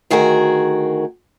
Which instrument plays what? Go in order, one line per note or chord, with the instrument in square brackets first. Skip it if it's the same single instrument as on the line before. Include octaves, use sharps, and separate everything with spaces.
[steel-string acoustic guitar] D2 D#3 F#4 G#4 A#4